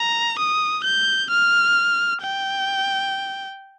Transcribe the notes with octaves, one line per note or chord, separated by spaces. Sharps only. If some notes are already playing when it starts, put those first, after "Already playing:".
Already playing: A#5
D#6
G6
F6
G5